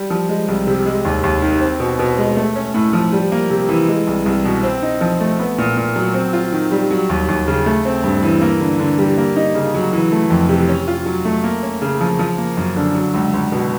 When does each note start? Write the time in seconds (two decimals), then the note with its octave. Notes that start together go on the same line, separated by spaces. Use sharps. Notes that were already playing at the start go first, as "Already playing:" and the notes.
Already playing: G3
0.10 F3
0.29 G#3
0.48 C2
0.67 C3
0.86 G#3
1.05 D#2
1.23 D#2
1.42 D#3
1.61 C4
1.80 B2
1.99 B2
2.18 G#3
2.37 A3
2.56 C#4
2.74 A2
2.93 F3
3.12 G3
3.32 A#3
3.50 C3
3.69 E3
3.88 G#3
4.07 C2
4.26 C2
4.45 B2
4.63 C4
4.82 D#4
5.01 F3
5.20 A3
5.39 B3
5.58 A#2
5.77 A#2
5.96 F#3
6.14 C4
6.33 F4
6.52 D#3
6.71 G3
6.91 F#3
7.09 D#2
7.28 D#2
7.47 C#3
7.66 A3
7.85 C4
8.04 G2
8.23 E3
8.41 A#3
8.60 D3
8.79 D3
8.98 G3
9.17 A#3
9.36 D#4
9.55 C#3
9.74 F#3
9.93 E3
10.12 A3
10.30 F2
10.49 C3
10.68 C#4
10.88 F4
11.06 F#3
11.25 A3
11.44 A#3
11.63 C#4
11.82 C#3
12.01 F3
12.19 F3
12.38 A#3
12.57 F#2
12.76 D3
12.95 F#3
13.14 C#2
13.33 C#2
13.52 B2